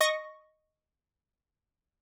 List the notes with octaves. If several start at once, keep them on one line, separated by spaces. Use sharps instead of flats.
D#5 C#6 A#6